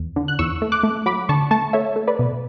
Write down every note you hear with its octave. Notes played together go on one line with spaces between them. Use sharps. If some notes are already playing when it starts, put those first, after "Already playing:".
Already playing: E2
D3
F#6
E2 C#6 E6
A3
D6 F#6
A3
F#3 B5 D6
D3 A5 C#6
A3 A5 C#6
A3 C#5 E5
A3
B4 D5
B2